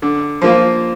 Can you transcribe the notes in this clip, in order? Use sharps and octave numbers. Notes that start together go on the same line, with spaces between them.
D3
F3 A#3 F4